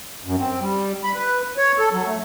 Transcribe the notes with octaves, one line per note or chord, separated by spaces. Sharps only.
F#2
C4
G3
B5
B4
C#5
A4
F#3
A3